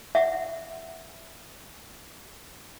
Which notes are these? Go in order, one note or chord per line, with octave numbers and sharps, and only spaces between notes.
E5 F#5